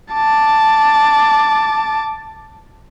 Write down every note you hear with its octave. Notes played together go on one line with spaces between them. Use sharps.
A5 D6